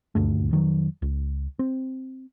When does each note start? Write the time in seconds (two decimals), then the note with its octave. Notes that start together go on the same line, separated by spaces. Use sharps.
0.15 D#1 D2 G2 A3
0.51 F2 D#3 F#3
1.02 C#2
1.59 C4